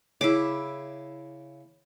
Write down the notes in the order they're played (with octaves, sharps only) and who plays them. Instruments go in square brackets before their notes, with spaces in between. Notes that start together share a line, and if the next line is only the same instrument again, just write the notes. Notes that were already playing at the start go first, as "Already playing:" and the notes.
[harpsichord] C#3 [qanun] E4 D6